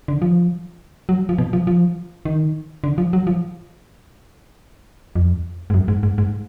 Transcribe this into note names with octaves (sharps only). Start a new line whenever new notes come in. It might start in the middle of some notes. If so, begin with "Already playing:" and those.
D3
F3
F#3
F3
B2
F3
F3
D#3
D3
F3
F#3
F3
F2
G#2
F#2
G#2
G#2
G#2